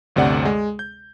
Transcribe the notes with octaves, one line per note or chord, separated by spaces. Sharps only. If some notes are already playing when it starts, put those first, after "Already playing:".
G1 D2 C3 D5 F#5
G#3
G6